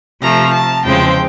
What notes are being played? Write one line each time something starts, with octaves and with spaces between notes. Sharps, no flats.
C3 F3 A3 A#5
A5
E2 C#3 F3 G#3 C4 G5